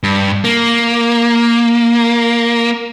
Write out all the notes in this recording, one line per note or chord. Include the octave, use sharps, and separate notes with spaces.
G2
A#3